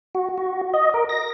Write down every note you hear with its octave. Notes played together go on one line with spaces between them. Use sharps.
F#4
F#4
D#5
A#4
A#6